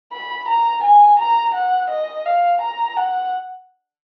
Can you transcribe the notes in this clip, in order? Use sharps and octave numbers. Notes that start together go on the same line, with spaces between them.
B5
A#5
G#5
A#5
F#5
D#5
F5
A#5
F#5